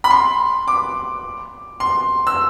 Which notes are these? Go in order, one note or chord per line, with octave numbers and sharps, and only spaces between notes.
B5
C6
D6
C6
E6